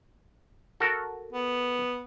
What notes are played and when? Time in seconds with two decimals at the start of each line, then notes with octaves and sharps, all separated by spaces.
0.80 F#4 A4 A#4
1.33 B3